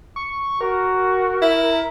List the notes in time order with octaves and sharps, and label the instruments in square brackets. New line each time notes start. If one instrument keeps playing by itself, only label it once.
[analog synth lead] C#6
[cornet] F#4 [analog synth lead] A#4
[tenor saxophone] E4